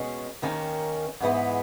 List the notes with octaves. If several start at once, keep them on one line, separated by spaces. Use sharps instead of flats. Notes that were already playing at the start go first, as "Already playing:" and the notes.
Already playing: B2 G#3 C#4
D#2 D#3 A#3 C#4
G#2 E3 G#3 B3